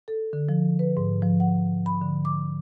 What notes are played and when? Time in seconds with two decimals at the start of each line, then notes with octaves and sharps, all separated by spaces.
0.08 A4
0.33 D3
0.49 F3
0.79 B4
0.97 G#2
1.22 F3
1.40 F#5
1.86 B5
2.01 D3
2.25 D6